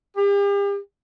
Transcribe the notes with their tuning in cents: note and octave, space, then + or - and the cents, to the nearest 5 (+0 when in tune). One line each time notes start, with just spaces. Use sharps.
G4 +40